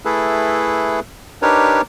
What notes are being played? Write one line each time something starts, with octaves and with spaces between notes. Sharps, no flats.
A3 E4 G#4 A4 B4
D4 D#4 G4 A#4 B4 C#5